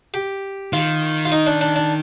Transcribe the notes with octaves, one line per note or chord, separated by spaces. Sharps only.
G4
D#3 F4
F4
D#4
D4
D4
D4